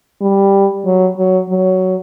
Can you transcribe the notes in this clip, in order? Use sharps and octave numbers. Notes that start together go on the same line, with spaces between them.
G3
F#3
F#3
F#3